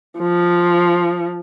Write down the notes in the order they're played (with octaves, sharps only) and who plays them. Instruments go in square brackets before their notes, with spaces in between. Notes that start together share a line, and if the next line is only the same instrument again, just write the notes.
[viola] F3